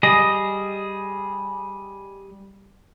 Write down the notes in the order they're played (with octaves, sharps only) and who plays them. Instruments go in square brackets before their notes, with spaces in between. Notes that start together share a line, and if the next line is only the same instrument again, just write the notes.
[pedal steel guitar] G3 G#4 D#5